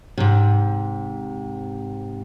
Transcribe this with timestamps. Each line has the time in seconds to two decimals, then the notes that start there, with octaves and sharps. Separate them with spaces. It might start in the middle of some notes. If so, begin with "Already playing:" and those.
0.18 G#2 C3